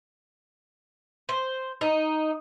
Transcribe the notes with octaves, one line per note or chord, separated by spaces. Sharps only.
C5
D#4